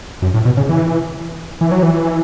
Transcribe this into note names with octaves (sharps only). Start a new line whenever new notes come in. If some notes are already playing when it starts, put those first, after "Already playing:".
F#2
A2
B2
C#3
E3
E3
F#3
E3